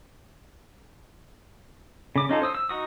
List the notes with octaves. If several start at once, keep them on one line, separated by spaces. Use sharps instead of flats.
C#3 D6
C#4 D#4 F4 A4
C5 D#6 E6
E6
D#4 F#4 D#6